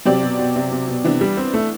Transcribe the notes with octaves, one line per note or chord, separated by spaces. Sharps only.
C3 F#3 C4 G4 D5
B2
B2
C3
C3
B2
C3 E3 B3 D4
G3
C4
A3